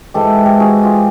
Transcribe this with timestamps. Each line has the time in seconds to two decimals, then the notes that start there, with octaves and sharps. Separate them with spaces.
0.14 G#2 E3 G#3 G4 A4
0.45 G4 A4
0.60 F#4 G#4
0.83 F4 G4